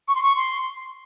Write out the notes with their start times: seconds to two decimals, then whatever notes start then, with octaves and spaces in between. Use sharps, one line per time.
0.08 C#6
0.15 C6
0.23 C#6
0.37 C6